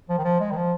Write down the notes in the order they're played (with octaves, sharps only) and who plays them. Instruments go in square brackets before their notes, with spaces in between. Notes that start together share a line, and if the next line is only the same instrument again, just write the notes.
[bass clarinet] F3
D#3
F3
G#3
D#3
F3